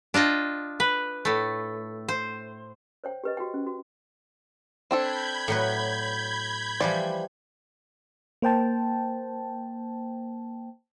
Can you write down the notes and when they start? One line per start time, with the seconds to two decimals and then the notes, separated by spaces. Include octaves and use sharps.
0.14 D4 F4 D#5 G5
0.80 B4
1.25 A2 A3
2.08 C5
3.04 C5 C#5 G5
3.24 G4 B4 D#5
3.37 F#4 G4 G5
3.54 C#4
3.67 F#4
4.91 C4 D4 A4 B5 G6 G#6
5.48 A2 F#3 B4
6.81 E3 F3 G3 D5
8.42 A#3 C5 G5 A5